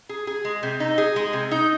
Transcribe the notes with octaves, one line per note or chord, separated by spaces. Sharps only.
G#4
G#4
G#3
C3
D#4
G#4
G#3
C3
D#4